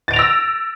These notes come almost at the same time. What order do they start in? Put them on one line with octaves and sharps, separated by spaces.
A6 D7 F7 A#6 E6